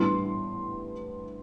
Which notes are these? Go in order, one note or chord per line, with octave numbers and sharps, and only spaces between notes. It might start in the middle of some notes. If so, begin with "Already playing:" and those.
Already playing: A2 E3 G3 B3 D4 C6